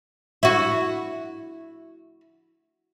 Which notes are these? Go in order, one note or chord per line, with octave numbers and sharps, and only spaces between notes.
E4 F#4